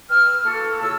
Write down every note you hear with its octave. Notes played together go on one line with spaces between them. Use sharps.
B4 G5 E6 F6
A#3 E4 F#4 A4
C#3 F4 C#5 A5 E6